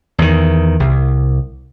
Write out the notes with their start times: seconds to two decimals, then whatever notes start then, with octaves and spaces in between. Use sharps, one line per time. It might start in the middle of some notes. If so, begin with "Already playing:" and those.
0.18 E2 D#3
0.80 C2